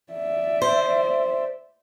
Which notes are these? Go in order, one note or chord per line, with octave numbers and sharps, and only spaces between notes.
D5 E5
C5